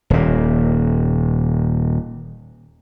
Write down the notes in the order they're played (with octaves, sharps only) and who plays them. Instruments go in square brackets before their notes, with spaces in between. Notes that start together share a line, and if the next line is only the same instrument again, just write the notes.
[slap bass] D#1 A#2